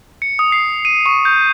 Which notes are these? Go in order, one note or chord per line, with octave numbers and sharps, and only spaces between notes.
C#7
D#6
C7
D#7
C#6
G6